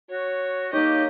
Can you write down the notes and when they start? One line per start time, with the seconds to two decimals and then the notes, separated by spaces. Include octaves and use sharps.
0.11 F#4 C#5
0.73 A#3 D#4 G4 C#5 D#5